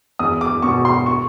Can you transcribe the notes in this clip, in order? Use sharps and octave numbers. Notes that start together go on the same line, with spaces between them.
E2 D#6
D6
B2 C#6
C6
C#6